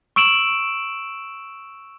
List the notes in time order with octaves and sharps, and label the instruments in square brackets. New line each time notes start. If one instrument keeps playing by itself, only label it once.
[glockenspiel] C#6 E6 D7 E7 F#7